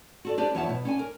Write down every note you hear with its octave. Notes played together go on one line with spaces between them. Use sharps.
F#4 A4 D5
D4 G4 B4 C5 D5
E2 F3 C#5 E5 F#5 A5
B2
C#4 D4 G#5
A#4